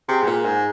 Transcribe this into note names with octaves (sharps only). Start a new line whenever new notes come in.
C3 G#4
G#2
A#2
G#2